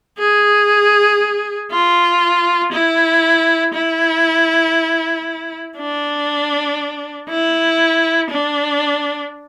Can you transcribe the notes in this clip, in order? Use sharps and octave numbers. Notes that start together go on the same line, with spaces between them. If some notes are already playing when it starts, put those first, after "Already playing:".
G#4
F4
E4
E4
D4
E4
D4